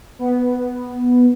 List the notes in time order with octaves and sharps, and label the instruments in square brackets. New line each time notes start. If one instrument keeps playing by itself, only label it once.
[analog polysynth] B3